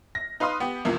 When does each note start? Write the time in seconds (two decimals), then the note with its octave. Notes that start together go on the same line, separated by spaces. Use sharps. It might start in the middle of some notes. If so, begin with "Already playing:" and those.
0.15 A#6
0.40 D#4 B4 F5 C6 D#6
0.60 B3 G4
0.85 A#1 C3 E3 F3 A#3